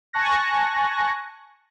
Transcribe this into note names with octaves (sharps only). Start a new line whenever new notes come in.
G#5 A5 C#6 F#6 A#6